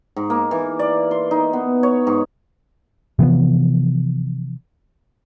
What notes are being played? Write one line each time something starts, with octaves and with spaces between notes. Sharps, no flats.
G#2
A#3
E3
D5
C6
D#4
B3
C#5
G#2
C3 E3 F3 B3